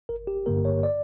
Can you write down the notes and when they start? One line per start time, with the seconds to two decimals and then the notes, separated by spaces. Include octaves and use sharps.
0.09 G1 A#4
0.27 G4
0.46 G2 D3 A#3 A#4
0.65 C#5
0.83 D5